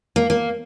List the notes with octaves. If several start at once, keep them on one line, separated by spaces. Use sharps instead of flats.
A#3
A#3